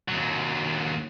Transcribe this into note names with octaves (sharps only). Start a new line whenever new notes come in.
D#2 F#3